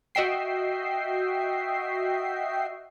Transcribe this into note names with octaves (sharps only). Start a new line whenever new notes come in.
F#4 D#5 E5 G5 C7